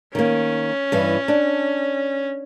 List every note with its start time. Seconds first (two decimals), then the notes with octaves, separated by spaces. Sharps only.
0.15 D#3 A#3 C#4
0.92 G2 E3
1.28 D4